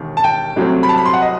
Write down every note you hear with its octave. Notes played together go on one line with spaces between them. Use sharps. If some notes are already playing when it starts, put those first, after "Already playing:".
Already playing: E1 D#2 D#3
A5
G5
C2 C3 F#3 A3 C4
B5
A5
B5
C6
F#5
D#5